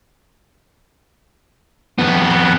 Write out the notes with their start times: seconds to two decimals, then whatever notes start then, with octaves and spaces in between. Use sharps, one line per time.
1.98 F2 B3